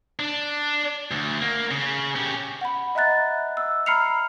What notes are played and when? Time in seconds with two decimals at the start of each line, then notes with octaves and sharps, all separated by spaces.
0.20 D4
1.11 D2
1.41 A#3
1.71 C#3
2.16 C#4 G4
2.61 F#5 B5
2.95 D#5 E5 A#5 F#6 A6
3.57 E6
3.86 A#5 B5 F6 C7 C#7 F7